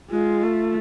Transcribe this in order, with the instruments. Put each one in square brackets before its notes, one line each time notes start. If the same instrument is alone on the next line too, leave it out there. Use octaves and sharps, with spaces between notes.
[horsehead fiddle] G#3 [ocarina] F4
[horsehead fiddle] A3